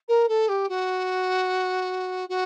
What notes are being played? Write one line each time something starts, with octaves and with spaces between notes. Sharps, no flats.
A#4
A4
G4
F#4
F#4